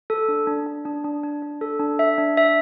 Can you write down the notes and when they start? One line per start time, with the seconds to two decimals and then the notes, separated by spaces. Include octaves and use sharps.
0.10 A4
0.28 D4
0.47 D4
0.67 D4
0.85 D4
1.04 D4
1.23 D4
1.42 D4
1.61 A4
1.80 D4
1.99 E5
2.18 D4
2.37 E5